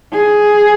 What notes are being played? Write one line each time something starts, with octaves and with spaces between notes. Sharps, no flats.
G#4